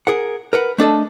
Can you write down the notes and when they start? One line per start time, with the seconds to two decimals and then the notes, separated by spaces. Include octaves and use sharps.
0.07 G#4 A#4 F#5
0.53 A#4 B4 F#5
0.78 A3 D4 A4 D#5